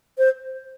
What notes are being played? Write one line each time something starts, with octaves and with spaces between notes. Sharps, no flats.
C5